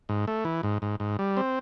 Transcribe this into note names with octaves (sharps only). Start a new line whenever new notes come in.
G#2
A3
E3
G#2
G#2
G#2
G3
C4